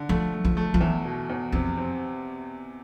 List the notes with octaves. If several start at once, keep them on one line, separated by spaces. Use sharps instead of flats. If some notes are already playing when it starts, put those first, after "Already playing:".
Already playing: D3
F3 A3
A3
F3
A3
F3
E2 E3
B2
E2
F2 C3
C4